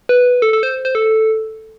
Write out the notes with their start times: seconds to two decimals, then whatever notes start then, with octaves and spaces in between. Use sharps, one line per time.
0.09 B4
0.42 A4
0.53 A4
0.63 C5
0.85 C5
0.95 A4